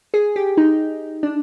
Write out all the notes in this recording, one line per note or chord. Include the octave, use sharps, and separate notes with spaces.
G#4
G4
D#4
D4